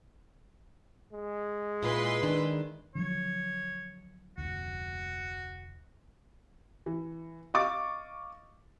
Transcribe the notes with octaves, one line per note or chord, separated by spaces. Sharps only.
G#3
A#2 E4 F4 B4 C6
D#3 D4
D3 F3 F#3 C#5
F1 D2 F#4
E3
D#5 F5 C#6 D6 A6